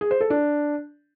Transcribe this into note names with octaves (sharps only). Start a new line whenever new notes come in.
G#4
C5
A4
D4